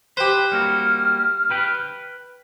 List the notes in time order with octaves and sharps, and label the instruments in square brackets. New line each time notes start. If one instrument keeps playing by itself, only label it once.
[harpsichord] G4 C5 [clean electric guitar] B4
[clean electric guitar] G3 A#3 F#4 [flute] F6
[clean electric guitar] B4 G5 B5